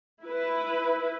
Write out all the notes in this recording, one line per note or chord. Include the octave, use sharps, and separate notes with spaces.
E4 B4